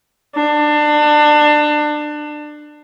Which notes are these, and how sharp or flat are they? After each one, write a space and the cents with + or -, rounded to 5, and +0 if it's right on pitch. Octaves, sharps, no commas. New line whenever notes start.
D4 +25